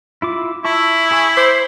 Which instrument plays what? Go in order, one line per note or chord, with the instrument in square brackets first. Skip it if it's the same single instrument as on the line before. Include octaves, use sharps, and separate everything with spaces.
[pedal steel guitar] E4 F4 D6
[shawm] E4 [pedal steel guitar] E5 A5 C#6
[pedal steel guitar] G#4 G#5 C#6
[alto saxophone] C5 [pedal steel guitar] D6